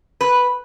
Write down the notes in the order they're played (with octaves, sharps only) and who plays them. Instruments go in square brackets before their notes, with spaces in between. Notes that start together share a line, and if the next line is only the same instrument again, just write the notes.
[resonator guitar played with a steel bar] B4